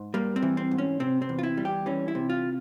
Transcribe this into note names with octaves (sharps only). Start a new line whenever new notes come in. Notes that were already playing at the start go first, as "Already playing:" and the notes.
Already playing: G#2
G3 A#3
C4
E3
C4
G#2
C#4
C3 C4
C4
E2
F4
E4
G3
G4
E3 C#4
E4
C3
F4